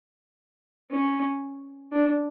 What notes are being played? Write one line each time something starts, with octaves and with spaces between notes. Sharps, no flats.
C#4
D4